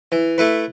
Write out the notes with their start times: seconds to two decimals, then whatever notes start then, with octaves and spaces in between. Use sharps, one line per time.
0.12 E3
0.38 A3 E4 B4